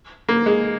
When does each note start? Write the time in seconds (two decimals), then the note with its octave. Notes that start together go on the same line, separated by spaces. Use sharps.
0.29 A#3
0.46 G#3